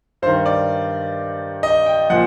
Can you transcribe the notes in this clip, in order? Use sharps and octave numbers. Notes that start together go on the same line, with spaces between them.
G2 D#3 C5
D5
D#5
G5
A#2 F3 F#5